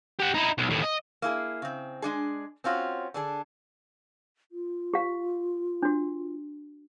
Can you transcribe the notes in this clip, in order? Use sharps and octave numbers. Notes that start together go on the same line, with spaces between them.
G4 F#5
D#4 E4
B1
D#2 A2
D#5
A#3 E4 G#4
C#3 C4
G#3 D4 G#4
C4 C#4 F4 F#4
D3 D4 G#4
F4
G4 F5
D4 F#4